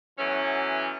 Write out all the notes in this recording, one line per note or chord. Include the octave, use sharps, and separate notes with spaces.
B2 E3 F#3 A3 C#4